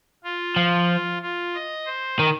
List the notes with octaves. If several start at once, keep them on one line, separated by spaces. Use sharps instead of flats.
F4
F3
F4
D#5
C5
D#3